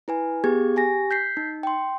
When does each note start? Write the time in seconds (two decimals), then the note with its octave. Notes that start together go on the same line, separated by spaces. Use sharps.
0.08 E4 B4 G#5
0.44 B3 G4 G#4 G#6
0.76 G4 G#5 A#6
1.11 G6 B6 C7
1.37 D#4
1.63 G5 C6